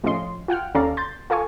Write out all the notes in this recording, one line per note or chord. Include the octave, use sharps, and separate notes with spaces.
A2 F3 C#4 F4 D#5 C6
F4 F#5 G5 F6
D#2 C#4 A4 D5 F5 A#5
C6 G6 A6
F4 A4 F5 G#5 C#6